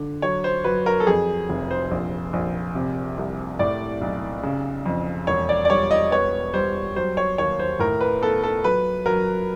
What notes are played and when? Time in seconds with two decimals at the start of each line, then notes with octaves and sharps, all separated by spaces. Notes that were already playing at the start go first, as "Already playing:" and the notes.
Already playing: D3
0.22 F#3 C#5
0.44 C5
0.64 F#3 B4
0.86 A#4
1.00 A4
1.07 F2 G#4
1.49 F1
1.71 C5
1.91 A#1
2.33 A#1
2.75 C3
3.17 C2
3.59 A2 D5
4.01 B1
4.43 C#3
4.86 F2
5.27 E1 C#5
5.49 D5
5.65 D5
5.69 G3 C#5
5.91 D#5
6.11 B3 C#5
6.54 G3 C5
6.96 F#3 C5
7.17 C#5
7.38 D#2 C#5
7.59 C5
7.79 A2 A#4
8.01 B4
8.22 B3 A4
8.43 A4
8.64 F#3 B4
9.06 F#3 A#4